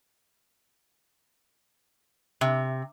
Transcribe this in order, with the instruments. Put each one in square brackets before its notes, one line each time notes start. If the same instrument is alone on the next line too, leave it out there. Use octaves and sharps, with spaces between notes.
[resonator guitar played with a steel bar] C3